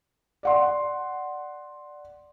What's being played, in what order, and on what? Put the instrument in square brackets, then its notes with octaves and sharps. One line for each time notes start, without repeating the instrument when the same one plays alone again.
[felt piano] D5 F#5 C6